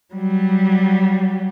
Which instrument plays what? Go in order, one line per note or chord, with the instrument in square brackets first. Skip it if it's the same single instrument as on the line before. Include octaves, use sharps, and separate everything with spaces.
[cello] F#3 G3